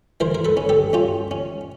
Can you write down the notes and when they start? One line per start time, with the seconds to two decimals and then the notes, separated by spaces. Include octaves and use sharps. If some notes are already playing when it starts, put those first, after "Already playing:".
0.20 E3 A#4 C5
0.35 A#4
0.45 A4 B4
0.57 C#4
0.69 G4 A4
0.93 C#4 F4 G4
1.31 C#4